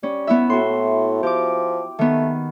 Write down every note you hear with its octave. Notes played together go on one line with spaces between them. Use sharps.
G3 C#4
B3 E4 E5
A2 F#4 C6
F3 G4 D6
D#3 A3 B3